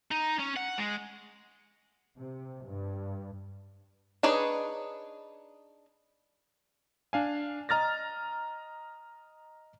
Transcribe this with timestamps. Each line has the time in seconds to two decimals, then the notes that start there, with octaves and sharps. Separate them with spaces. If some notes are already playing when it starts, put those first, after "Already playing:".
0.11 D#4
0.39 C#4
0.56 F#5
0.78 G#3
2.18 C3
2.66 G2
4.23 D4 D#4 G#4 B4 C#5
7.13 D4 F5 G#5
7.69 D#5 A#5 F6 A6 A#6